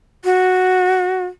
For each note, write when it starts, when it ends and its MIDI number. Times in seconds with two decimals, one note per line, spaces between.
0.24 1.25 66